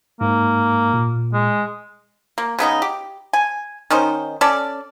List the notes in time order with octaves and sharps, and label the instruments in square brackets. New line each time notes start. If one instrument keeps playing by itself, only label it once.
[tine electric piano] G#2 [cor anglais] A#3
[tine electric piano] A#2
[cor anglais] G#3
[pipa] A#3
C#3 B3 D#4 G#4
G4
G#5
D#3 C#4 D#4 C5
C#4 A4 D5